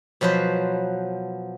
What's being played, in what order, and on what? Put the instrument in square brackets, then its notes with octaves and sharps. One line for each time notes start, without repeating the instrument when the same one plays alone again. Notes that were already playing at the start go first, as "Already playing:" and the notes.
[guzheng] B2 F3 F#3 B4 C5